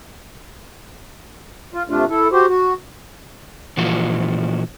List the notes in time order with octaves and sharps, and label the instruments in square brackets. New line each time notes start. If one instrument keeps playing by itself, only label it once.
[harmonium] F4
C3 A3 D4 F4
E4 A4
F#4 G4 C5
F#4
[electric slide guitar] A#2 E3 F3 F#4